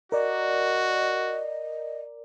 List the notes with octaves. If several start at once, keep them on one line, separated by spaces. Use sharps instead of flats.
F#4 A#4 D5 D#5